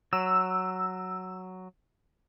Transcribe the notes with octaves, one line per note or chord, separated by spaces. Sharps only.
F#3 E6